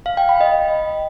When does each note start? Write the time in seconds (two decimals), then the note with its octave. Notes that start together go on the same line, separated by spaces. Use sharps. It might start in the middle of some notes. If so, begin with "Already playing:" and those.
0.06 F5
0.17 G5
0.29 B5
0.41 D#5